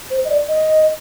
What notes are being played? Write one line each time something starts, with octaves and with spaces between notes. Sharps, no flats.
C5
D#5
D5
D#5